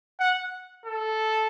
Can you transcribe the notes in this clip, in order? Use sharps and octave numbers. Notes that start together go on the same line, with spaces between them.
F#5
A4